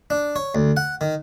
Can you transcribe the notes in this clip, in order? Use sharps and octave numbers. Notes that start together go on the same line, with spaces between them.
D4
C#5
D2
F#5
D#3